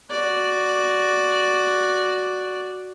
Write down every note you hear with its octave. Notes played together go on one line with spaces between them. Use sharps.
F#4 D5